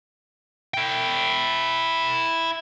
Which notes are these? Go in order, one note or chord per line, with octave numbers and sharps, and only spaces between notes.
E4 G5